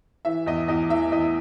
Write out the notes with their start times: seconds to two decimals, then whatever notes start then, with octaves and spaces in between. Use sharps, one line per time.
0.25 E3 E5
0.46 E2 D#5
0.68 E2 D#5
0.90 E3 E5
1.12 E2 D#5